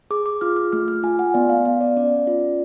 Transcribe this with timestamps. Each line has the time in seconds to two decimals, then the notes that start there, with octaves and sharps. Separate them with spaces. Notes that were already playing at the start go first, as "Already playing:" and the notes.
0.11 G#4 D6
0.26 D6
0.41 F4 F6
0.56 F6
0.72 A3 F6
0.88 F6
1.03 F4 G#5
1.19 F#5
1.34 B3 D5
1.49 F5
1.65 B3 F5
1.81 D5
1.97 C#4 D5
2.27 F4